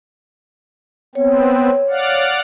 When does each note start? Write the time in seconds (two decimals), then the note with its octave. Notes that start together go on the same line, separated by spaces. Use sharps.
1.15 B3 C4 C#5
1.90 D5 F5 F#5